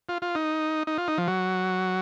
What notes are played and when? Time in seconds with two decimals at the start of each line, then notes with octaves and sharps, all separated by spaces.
0.09 F4
0.22 F4
0.35 D#4
0.87 D#4
0.98 F4
1.08 D#4
1.18 F3
1.28 F#3